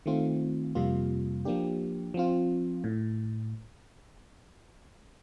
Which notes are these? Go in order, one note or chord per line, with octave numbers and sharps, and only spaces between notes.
D#3 A3 C4 F4
F2 C3 G3 A#3 F4
F3 A#3 D4 G4
F3 C4 F4
A2